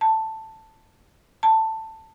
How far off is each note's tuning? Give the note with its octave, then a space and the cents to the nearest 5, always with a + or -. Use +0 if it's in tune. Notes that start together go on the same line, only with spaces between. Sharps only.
A5 +5
A5 +15